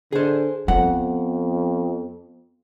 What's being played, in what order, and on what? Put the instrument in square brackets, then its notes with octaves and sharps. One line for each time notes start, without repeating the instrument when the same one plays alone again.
[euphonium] D3 [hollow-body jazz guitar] G#4 C5
[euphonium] F2 [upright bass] B3 [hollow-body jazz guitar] F#5